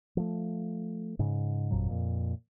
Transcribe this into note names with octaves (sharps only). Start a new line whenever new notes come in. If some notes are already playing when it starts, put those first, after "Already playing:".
F3 A3
G#2 C#3
G1 F2 A#2 F#3
F2 A#2